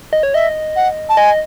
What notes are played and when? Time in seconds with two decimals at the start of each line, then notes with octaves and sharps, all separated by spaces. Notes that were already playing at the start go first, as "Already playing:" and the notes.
0.13 D#5
0.23 C#5
0.34 D#5 E5
0.76 F#5
1.09 A5
1.17 D#5 G#5